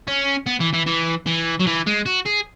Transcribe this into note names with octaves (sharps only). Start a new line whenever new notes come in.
C#4
B3
E3
E3
E3
E3
F#3
E3
G#3
F#4
G#4